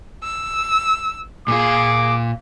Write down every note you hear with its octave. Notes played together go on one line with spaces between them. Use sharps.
E6
A#2 F4 G#4 D6